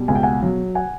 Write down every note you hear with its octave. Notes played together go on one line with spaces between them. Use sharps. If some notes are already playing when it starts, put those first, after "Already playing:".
Already playing: B2 G3
C#2 G#5
G5
F#5 G#5
F#3
F#5 G#5